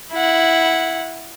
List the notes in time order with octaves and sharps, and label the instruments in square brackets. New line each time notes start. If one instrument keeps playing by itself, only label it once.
[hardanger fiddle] E4 F#5